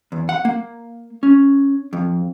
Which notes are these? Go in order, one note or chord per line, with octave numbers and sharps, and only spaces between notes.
E2
F#5
A#3
C#4
F2